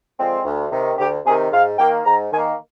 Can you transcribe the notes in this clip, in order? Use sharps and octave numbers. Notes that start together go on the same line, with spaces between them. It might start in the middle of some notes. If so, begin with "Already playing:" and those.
D3 F3 G#3 C4
D2
C3 D#3
D2 G4
C3 D#3 G#4
G#2 F5
D#3 A#3 G5
G#2 A#5
D#3 A#3 G#5